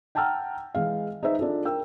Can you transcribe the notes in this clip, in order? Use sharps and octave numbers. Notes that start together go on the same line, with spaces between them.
F#5 G5 A5 A#5 E6 F6
E3 G#3 F5
D#4 G#4 B4 C5 E5
D4 F4 G#4 A4
A#4 G5 E6